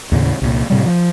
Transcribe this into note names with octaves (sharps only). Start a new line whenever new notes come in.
D#2 A2 C#3
C2 A#2
A2 C3 G3
F3